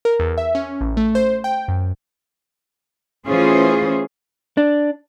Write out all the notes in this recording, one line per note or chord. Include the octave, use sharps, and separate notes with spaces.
A#4
E2
E5
C#4
A1
A3
C5
G5
F#2
E3 A3 C#4 F4 G#4 C5
D4